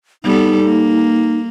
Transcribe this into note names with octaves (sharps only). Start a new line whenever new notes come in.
G3 B3 D#4 A4
A#3